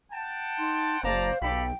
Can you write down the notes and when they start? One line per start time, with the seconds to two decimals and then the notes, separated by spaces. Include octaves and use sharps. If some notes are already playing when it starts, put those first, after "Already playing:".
0.11 F#5 G5 A5
0.59 D#4 C6
1.03 F#1 C5 D5 F5 A5 A#5
1.42 B1 G4 A4 G5 B5